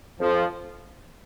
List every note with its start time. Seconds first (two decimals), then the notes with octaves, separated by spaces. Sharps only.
0.20 F2 F3